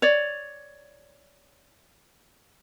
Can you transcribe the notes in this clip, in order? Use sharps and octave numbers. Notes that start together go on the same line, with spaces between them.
C#5 D5